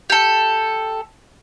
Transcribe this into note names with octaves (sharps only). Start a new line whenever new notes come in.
G4 A4